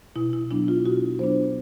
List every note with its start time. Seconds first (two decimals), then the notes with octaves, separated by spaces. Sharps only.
0.16 B2 E4
0.33 E4
0.51 F#3 B3 D4 E4
0.68 F4
0.85 B2 F#4
1.19 F#3 B3 D4 C5